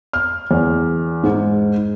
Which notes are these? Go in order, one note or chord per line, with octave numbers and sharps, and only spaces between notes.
F6
E2
G#2